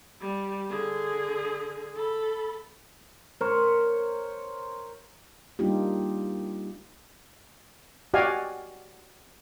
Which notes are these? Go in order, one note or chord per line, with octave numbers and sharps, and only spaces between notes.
G3
D3 G#4
A4 B5
A#4 C5 C#5
G3 A#3 D4 D#4 F4 G4
F#4 G4 D5 D#5 F5 G#5